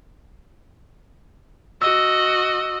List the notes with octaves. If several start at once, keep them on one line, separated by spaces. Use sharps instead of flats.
F#4 D#5 E6